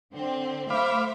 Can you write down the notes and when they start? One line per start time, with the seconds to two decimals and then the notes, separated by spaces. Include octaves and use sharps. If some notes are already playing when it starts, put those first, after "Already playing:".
0.16 D3 C4
0.70 A3 C5 E5 F5 B5 D6